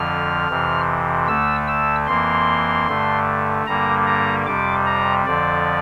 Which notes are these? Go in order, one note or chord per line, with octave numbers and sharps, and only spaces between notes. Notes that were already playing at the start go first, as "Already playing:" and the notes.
Already playing: F2 D3 F3 F6
F2 C3 E3
D2 D3 A3 E6
E6
F2 E3 A#3 C6
G2 D3 A3
G2 D3 G3 A#3 A#5
A#5
F2 C3 G3 D6
A#5
F2 D3 F3 D5